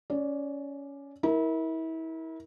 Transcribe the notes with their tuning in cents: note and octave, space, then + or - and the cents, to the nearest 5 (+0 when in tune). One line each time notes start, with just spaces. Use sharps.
C#4 +15 D5 +0
E4 -30 A#4 +10